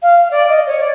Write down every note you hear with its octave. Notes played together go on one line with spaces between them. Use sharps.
F5
D5
D#5
C#5
D5